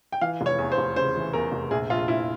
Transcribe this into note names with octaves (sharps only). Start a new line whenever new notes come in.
G5
E3 F5
F1
C#5
E2
C5
F1
C#3 C5
E3
E2 A#4
F1
A#1 G#4
A#1 F4
A#1 E4